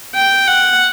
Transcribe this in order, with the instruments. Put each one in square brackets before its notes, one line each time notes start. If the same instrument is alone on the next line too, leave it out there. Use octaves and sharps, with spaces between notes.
[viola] G5
F#5